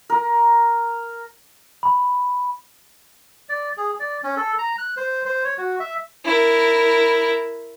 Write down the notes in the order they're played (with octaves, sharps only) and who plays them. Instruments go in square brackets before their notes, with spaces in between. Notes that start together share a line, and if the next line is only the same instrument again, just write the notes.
[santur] A#4
[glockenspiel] B5
[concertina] D5
G#4
D5
C#4
A4
A#5
F#6
C5
C5
C#5
F#4
E5
[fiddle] E4 A#4